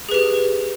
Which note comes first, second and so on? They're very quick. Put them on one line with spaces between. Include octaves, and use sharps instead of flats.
G#4 B4 G4